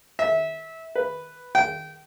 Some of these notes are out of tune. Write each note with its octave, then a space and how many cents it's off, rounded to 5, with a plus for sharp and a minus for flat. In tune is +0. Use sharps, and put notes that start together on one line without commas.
E5 -20
B4 +0
G5 -25